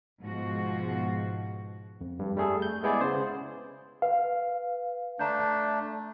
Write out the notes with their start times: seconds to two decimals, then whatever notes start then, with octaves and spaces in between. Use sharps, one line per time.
0.21 G#2 B2 F3 F#4
2.01 F2
2.19 G2
2.37 G3 A3 G#4 A4
2.62 G6
2.83 G#3 B3 E4 G#4 D5
3.01 C#3 C5
4.02 B4 F5
5.19 A3 D4 A5 A#5 G6